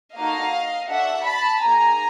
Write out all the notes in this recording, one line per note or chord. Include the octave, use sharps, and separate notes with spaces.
A#3 D#4 F#4 A4 D#5 F5
D4 F#4 A4 E5 F#5
A5 B5
A#3 D#4 G#4 G#5 A#5